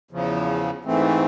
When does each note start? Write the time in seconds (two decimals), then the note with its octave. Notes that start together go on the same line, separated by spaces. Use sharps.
0.11 E2 C#3 F3
0.85 G#2 E3 A3 C4